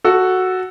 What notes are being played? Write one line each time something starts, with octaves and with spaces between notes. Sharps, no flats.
F#4 A4